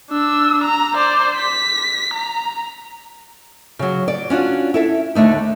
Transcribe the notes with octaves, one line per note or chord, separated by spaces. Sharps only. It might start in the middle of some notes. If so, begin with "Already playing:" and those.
D4 E6
A#5
C5 D5
B6
A#5
C#3 F#3
D5
C#4 D4 F4 F#4
E4 A4 E5
D#2 D3 A3 D#4